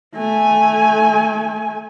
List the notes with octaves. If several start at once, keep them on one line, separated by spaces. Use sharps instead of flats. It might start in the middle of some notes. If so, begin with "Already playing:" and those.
A3 G#5